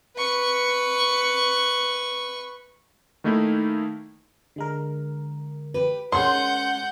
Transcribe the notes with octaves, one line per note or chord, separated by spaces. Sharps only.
B4 C#6
D#3 A3 A#3 D#4 E4
D3 G#3 A#4
G4 B4
G#3 C#4 G#4 A#4 F#5 C6 G6